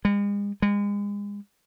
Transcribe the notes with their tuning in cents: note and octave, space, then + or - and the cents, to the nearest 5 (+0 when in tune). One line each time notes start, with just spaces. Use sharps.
G#3 -45
G#3 -35